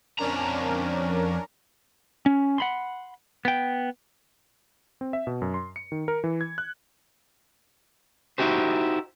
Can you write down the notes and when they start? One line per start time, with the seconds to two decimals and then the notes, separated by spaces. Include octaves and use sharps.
0.19 F2 C#4 D4 A#4 A#5
2.26 C#4
2.58 F#5 B5 C6
3.45 B3 G5
5.01 C4
5.13 E5
5.27 B2
5.42 F#2
5.54 C6
5.76 C#7
5.92 D#3
6.08 A#4
6.24 E3
6.41 G#6
6.58 F#6
8.38 D#4 E4 F#4 G4 C5